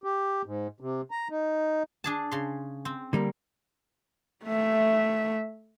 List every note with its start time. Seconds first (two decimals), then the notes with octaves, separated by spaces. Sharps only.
0.04 G4
0.46 G#2
0.80 C3
1.11 A#5
1.30 D#4
2.04 D4 G#4 A5
2.31 C#3 C6
2.85 C4
3.13 D3 G3 A#3
4.46 A3 E5